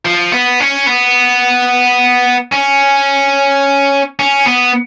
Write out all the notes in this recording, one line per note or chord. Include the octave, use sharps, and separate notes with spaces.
F3
B3
C#4
B3
C#4
C#4
B3